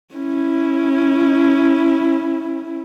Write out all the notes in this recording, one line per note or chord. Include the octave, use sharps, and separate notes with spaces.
C#4 E4